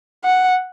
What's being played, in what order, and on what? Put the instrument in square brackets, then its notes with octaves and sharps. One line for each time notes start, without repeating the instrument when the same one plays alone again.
[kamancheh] F#5